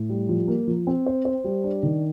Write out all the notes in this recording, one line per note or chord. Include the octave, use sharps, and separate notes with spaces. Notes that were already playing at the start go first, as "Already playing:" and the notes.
Already playing: A2
G3
F3
A#3
F3
C4
C5
C5
G3
D4
D#3